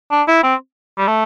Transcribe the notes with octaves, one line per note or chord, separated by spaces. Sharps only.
D4
E4
C4
G3
A3